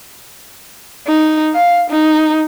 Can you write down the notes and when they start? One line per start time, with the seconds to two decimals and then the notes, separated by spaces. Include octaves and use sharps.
1.07 D#4
1.55 F5
1.90 D#4